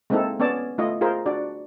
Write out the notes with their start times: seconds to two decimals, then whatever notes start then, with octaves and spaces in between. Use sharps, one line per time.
0.10 G#3 A#3 C4 D#4 E4 A4
0.40 B3 C#4 C#5 D5 A5
0.78 A3 E4 F4 D#5
1.01 F4 G#4 A#4 C5
1.26 D4 F#4 D5